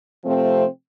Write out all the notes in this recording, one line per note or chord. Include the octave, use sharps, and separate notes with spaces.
C3 F3 A3 C4